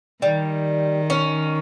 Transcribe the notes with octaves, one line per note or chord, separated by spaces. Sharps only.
D#3 G3
C#4